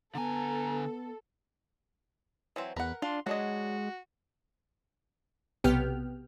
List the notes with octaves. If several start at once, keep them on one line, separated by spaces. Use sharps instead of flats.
D3 B3 A4 G#5 A#5
E3 F#3 C4
E2 A#4 B4 F#5
D4 F4 C6
F#3 G#3 D4 F#4 D#5
B1 C3 B3 G4 G5 F6